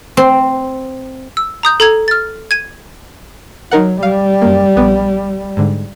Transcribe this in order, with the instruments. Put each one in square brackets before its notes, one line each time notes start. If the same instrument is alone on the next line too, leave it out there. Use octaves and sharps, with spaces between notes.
[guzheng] C4
[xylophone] E6
A#5 D#6 G6
A4 A#5 G#6
F6 A6
G#6 D#7
[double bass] F#3 [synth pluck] D#4 A#4 F#5
[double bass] G3 [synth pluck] F5
[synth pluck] F#2 A#3
A#1 B3
G#2 D3